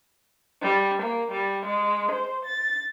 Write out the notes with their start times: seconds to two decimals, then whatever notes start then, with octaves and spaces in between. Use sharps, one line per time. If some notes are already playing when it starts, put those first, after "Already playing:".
0.62 G3
1.01 A#3
1.31 G3
1.66 G#3
2.12 C5
2.46 A6